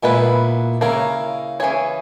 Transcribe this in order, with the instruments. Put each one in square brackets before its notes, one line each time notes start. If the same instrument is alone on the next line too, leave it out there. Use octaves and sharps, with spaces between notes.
[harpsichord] A#2 [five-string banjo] G#3 B3 E4 B4
[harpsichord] C#3 [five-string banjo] A#3 E4 A#4 C#5
[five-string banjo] E3 A#3 C#4 G#4 C#5